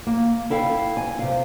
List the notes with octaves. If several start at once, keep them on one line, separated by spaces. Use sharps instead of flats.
A#3
E4 A4 F5 G5
G#5
C3 F5